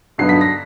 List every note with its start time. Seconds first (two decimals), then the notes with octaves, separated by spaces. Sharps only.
0.18 G2 D3 F#3 B3 D#4 C7
0.29 B6
0.41 A#6